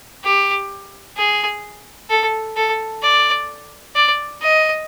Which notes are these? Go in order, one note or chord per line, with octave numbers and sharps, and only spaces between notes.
G4
G#4
A4
A4
D5
D5
D#5